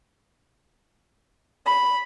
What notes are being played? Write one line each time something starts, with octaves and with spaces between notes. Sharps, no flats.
B5